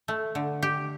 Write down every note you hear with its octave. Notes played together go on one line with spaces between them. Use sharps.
A3
D3
G4